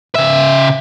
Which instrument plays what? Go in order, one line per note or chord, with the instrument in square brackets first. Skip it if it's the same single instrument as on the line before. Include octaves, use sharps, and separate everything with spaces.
[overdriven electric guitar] C#3 E5